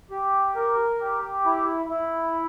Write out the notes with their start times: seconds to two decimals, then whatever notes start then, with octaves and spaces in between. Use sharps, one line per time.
0.11 G4
0.56 A#4
1.00 G4
1.46 E4
1.90 E4